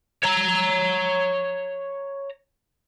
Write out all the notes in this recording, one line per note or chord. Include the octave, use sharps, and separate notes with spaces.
C#5 A#5